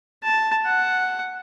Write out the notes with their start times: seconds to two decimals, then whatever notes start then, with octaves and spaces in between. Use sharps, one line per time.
0.24 A5
0.65 F#5